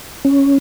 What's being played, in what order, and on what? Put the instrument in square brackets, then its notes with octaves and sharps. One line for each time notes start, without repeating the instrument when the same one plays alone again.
[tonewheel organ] C#4